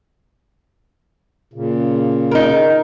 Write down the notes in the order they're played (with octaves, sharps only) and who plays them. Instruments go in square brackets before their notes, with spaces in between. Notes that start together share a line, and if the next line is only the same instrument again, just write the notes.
[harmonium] A#2 C#3
[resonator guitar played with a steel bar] D#4 A#4